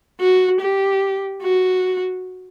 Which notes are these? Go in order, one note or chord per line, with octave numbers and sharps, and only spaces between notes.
F#4
G4
F#4